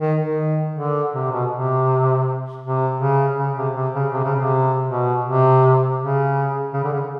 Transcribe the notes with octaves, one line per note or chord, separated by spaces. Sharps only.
D#3
D#3
D3
C3
B2
C3
C3
C#3
C#3
C3
C3
C#3
C3
C#3
C3
B2
C3
C#3
C#3
D3
C#3